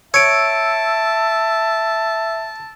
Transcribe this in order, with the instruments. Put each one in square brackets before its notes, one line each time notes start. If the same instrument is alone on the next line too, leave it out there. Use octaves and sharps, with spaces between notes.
[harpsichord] C#5 [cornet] E5 [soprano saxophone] A5 [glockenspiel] E6 D7